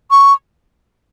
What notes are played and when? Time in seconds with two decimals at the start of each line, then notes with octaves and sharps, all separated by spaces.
0.11 C#6